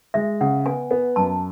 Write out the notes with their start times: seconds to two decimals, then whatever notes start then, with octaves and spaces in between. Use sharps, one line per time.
0.14 G#3 E5
0.41 C#3 F#5
0.66 B3 G#5
0.91 B3
1.16 F#2 A5